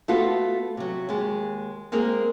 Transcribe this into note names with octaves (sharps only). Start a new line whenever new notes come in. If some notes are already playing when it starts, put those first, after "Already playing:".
A3 B3 F4 F#4 A4
C3 F#3
D#2 G#3
G#3 A#3 C4 G#4 A#4